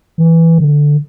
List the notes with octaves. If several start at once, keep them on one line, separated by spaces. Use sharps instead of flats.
E3
D3